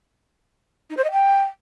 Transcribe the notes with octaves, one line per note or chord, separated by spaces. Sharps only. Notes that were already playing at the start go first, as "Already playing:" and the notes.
D#4
C5
D#5
G5